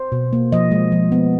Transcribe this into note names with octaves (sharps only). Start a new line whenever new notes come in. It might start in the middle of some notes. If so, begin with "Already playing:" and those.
Already playing: C5
B2
A#3
F3 D#5
G#3
F3
B3